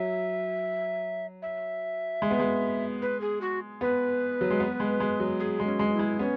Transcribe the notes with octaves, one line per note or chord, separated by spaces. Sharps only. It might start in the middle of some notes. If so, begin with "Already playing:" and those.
Already playing: F#3 E5
E5
G#3
B3
G#3
B4
G#4
F#4
B3 B4
F#3
G#3
B3
G#3
G#3
F#3
G#4
G#3
C#4
G#3
C#4
E4
G#3
B3 C#4